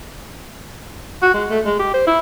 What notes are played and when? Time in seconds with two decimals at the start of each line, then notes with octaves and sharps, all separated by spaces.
1.22 F#4
1.34 G#3
1.50 A3
1.65 G#3
1.79 G4
1.94 C5
2.07 E4